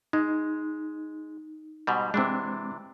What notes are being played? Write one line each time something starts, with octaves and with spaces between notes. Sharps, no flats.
G#3 D#4
G#2 B2 G3
C3 E3 G#3 C4 D4